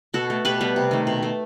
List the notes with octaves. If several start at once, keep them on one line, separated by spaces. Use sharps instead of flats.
B2 F#4 A4
A3
B2 G4 B4
G3 B3
C3
D#3 A3
B2
A3